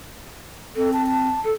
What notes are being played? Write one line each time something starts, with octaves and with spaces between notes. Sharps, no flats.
C4 A4
A5
A5
A4